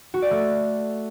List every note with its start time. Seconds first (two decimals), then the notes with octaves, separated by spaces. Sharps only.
0.14 F#4
0.22 D5
0.31 A3